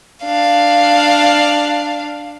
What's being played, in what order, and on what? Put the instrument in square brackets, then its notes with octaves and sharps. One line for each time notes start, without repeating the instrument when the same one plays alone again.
[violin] D4 F5